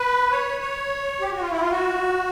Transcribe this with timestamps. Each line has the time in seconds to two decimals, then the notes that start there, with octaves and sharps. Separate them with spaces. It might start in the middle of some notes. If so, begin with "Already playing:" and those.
Already playing: B4
0.31 C#5
0.61 C#5
1.21 G4
1.31 F#4
1.41 F4
1.51 E4
1.61 F4
1.71 F#4